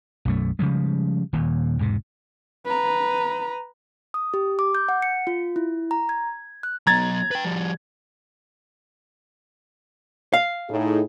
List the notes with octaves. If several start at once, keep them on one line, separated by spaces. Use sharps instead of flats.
B1 F#2 A3
C#3 F3 G3 G#3
D#1 D#2 A#2
E1 G#2 C3
B4 A#5
D#6
G4
D6
G6
F#5
C#7
F4
E4
A#5
G#6
F#6
F#3 B3 A#5 G#6 A6
B4 G5
F3 G3
F5
A2 D#4 G#4